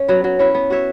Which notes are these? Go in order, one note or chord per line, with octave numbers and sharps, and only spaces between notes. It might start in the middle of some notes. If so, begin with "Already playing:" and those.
Already playing: C#4
F#3 B3
F#3
C#4 E4 B4
B3
F#4 C#5 E5